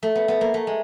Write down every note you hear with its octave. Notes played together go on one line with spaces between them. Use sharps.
A3
B3
B3
A#3
A3
G#3